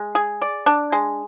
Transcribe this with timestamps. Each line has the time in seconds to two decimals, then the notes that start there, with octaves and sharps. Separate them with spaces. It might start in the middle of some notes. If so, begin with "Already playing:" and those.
Already playing: G#3
0.15 G#4
0.42 D5
0.66 D4
0.92 G#3